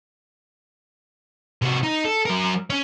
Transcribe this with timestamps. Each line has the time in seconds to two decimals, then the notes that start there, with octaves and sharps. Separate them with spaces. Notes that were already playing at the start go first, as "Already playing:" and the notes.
1.62 C3 F#4
1.83 D#4
2.05 A4
2.26 F#3 A#4
2.70 C#4